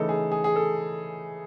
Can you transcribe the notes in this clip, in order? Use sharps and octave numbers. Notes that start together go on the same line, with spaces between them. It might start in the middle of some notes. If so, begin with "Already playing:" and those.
Already playing: C#3 E3 A3 D#4 A4
G#4
G#4
G#4
A4